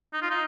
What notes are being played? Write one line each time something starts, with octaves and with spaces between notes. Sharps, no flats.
D#4
F4
D#4